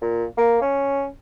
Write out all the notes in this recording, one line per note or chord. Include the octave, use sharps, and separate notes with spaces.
A#2
A#3
C#4